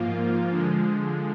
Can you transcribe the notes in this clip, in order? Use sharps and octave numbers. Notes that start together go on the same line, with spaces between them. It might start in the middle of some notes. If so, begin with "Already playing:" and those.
Already playing: G#2 F3 A#3 F4
D3 F3 G#3